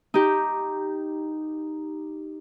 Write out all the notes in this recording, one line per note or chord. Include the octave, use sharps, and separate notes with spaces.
D#4 G4